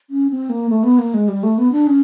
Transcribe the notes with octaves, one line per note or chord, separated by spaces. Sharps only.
C#4
C4
A#3
A3
B3
A#3
G#3
G3
A3
B3
D4
C#4